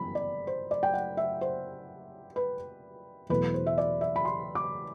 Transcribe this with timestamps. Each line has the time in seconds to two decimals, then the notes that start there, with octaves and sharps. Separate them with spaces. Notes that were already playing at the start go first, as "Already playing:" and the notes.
Already playing: G1 F#2 E3 B3 B5
0.15 D5
0.47 C5
0.71 D5
0.83 G5
0.94 F#5
1.17 E5
1.41 C5
2.36 B4
3.30 E2 B2 F#3 A3 B4
3.54 C5
3.66 E5
3.78 D5
4.01 E5
4.16 B5
4.25 C6
4.55 D6